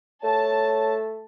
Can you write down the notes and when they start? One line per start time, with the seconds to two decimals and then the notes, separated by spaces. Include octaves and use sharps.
0.24 A3 C#5 A5